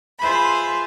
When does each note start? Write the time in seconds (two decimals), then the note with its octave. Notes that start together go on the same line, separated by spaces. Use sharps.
0.19 F4 G#4 B4 C5 E5 B5